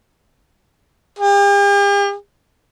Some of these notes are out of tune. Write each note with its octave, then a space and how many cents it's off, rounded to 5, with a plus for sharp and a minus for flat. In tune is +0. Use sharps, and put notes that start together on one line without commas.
G4 +45